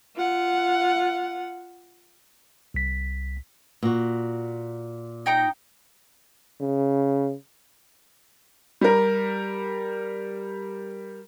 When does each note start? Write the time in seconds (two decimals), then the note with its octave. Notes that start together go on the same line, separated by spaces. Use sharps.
0.15 F4 F#5
2.74 C2 B6
3.83 A#2 F#4
5.26 D#4 G5 A#5
6.61 C#3
8.81 G3 A#4